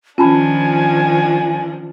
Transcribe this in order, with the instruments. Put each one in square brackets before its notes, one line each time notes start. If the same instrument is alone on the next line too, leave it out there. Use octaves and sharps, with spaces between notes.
[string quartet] D#3 F3 D4 [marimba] C#4 [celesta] F4 A5 B5 [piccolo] G#5